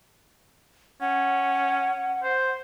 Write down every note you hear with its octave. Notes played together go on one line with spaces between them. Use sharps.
C#4 F#5
C5